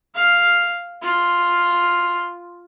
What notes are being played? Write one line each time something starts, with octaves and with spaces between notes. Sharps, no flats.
F5
F4